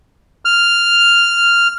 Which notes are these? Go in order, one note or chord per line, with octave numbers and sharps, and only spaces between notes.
F6